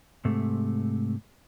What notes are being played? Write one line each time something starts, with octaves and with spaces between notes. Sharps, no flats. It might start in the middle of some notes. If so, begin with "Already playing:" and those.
G#2 C3 A3